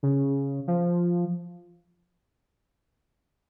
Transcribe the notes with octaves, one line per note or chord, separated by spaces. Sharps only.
C#3
F3